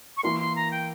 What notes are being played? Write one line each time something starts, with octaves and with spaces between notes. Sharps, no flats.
C#6
E3 A#3 E4 A#4 C6
C6
A#5
G5